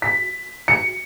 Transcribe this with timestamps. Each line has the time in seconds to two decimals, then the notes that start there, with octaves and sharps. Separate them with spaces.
0.02 B6
0.68 C#7